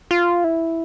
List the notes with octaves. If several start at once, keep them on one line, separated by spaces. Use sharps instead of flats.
F4
E4